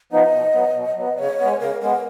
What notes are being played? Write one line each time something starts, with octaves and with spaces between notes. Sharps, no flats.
F3 B3 D#4 D#5
B2
F#3 B3
B2
F#3 B3
C#3 C#5
G#3 B3
C#3 A#4
G#3 B3 A#4